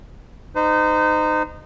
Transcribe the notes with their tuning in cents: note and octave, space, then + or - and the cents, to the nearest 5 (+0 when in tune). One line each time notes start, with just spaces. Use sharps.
D#4 -20 C5 -40